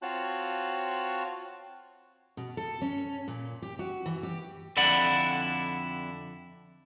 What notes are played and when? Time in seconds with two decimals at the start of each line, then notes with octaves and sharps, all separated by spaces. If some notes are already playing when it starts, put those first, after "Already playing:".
0.02 C4 F4 F#4 C#5 A5 F#6
2.37 B2
2.57 A4
2.82 C#4
3.28 A#2
3.62 G4
3.79 F#4
4.06 E3
4.23 G4
4.77 F2 D3 E4 D5 F#5 B5